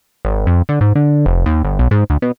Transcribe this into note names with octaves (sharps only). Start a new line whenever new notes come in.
G#1
F2
D3
G#2
D3
F1
D#2
G1
B1
G#2
D2
B2